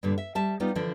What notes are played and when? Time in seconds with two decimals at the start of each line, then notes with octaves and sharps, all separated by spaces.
0.03 G2 A#2 D3 G3
0.18 E5
0.35 G3 E5 A5
0.60 G3 B3 D#4 F4
0.75 D3 E3 F3 D4 A4